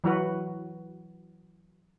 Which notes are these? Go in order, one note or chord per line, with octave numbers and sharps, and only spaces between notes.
E3 F#3 F#4 B4